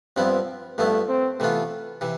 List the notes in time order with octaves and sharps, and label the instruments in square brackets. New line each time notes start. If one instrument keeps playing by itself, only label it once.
[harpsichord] G2 F3 B3 E4 [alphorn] C4
[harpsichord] G2 F3 B3 E4 [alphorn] A3
[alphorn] C4
[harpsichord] C3 E3 B3 F4 [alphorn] A3
[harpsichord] C3 E3